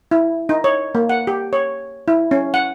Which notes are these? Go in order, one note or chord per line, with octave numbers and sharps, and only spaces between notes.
E4
D#4
C#5
A#3
F#5
G4
C#5
E4
C#4
F#5